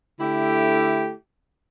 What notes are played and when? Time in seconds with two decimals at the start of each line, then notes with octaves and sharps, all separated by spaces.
0.18 D3 A3 E4 G4